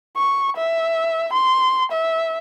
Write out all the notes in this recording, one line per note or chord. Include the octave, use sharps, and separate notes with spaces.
C#6
E5
C6
E5